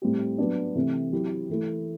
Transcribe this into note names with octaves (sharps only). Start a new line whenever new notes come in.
A2 G3 C4 G4
F#3 B3 D4
C3 E3 A3 C4
F#3 C4 E4 G4
E3 A3 E4